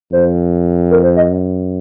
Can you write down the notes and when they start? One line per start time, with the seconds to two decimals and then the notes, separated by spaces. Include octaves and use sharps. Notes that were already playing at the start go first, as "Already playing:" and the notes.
0.12 F2 C5
0.91 A#4
1.04 C5
1.17 D#5
1.30 F#2